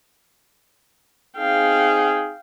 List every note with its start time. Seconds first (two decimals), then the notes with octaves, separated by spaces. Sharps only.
1.37 C4 D#4 G#4 F5 G5